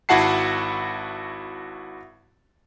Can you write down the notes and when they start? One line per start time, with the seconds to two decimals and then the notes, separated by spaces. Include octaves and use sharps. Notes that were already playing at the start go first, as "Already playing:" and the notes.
0.09 G#1 E4 F#4 F#5 A5 C7